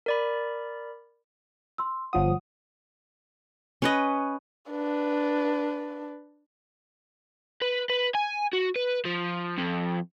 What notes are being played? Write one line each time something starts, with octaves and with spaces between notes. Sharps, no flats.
A#4 D5 B5
C6 E6
G1 F3 C#5 F#5 D#6
C#4 B4 D#5
D4 B4
B4
B4
G#5
F#4
B4
F3
F2